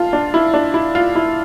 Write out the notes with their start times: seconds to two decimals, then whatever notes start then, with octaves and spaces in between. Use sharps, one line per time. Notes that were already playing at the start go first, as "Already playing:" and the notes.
Already playing: F4 A5
0.13 D4
0.34 E4
0.54 D4
0.74 E4
0.95 F4
1.16 E4